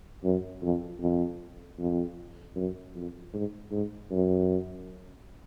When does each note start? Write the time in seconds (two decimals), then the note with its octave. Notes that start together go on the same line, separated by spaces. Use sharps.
0.24 F#2
0.62 F2
1.00 F2
1.79 F2
2.56 F#2
2.95 F2
3.34 G#2
3.72 G#2
4.11 F#2